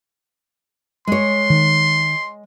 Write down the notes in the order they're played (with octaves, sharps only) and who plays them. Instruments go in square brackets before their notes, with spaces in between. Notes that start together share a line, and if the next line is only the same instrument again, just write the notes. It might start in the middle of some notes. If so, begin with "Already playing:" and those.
[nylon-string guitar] G#3 C#5 [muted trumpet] C6
[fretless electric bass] D#3